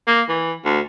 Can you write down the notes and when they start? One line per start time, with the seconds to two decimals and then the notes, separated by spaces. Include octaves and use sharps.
0.07 A#3
0.29 E3
0.65 D2